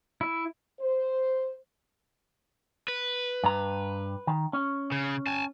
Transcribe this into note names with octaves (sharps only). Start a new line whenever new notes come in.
E4
C5
B4
G2 A#5
D#3
C#4
C#3
G#5 A5